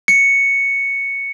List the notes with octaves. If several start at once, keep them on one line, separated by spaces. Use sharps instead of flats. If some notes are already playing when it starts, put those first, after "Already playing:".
C#7